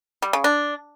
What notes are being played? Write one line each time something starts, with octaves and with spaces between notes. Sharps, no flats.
G3
C#3
D4